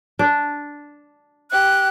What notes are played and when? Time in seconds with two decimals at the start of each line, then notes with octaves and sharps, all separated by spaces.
0.19 D4
1.51 G4 F#6